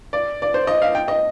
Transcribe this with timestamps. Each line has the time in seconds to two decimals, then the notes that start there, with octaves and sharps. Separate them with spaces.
0.13 D5
0.42 D5
0.54 C5
0.67 D#5
0.82 F5
0.95 G5
1.08 D#5